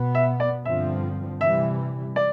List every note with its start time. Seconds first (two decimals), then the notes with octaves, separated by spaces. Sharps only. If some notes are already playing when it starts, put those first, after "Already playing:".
Already playing: B2 B3
0.15 E5
0.40 D5
0.65 G2 D3 F3 C4 E5
1.40 C3 E3 G3 E5
2.16 D5